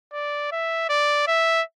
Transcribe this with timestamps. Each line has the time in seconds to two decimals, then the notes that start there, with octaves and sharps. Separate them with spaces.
0.13 D5
0.52 E5
0.90 D5
1.28 E5